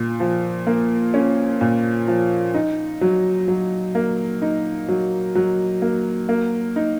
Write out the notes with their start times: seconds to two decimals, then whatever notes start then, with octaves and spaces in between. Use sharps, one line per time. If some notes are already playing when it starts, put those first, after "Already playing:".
Already playing: A#2
0.20 F3
0.67 A#3
1.14 C#4
1.61 A#2
2.08 F3
2.54 D#4
3.01 F#3
3.48 F#3
3.95 A#3
4.42 D#4
4.88 F#3
5.35 F#3
5.82 A#3
6.29 A#3
6.76 D#4